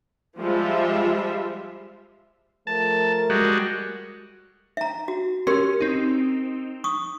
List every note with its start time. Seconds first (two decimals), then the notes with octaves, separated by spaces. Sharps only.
0.39 F3 G3 G#3 F4 E5
2.67 F3 A3 A#4 A5
3.30 G3 G#3 F#4
4.77 E5 A#5
5.08 F#4
5.47 C#4 G4 A#4 C6
5.81 C4 D#4
6.84 C#6 D#6